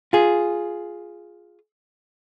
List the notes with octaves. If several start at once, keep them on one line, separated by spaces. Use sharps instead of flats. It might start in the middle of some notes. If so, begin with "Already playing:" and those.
F4 G#4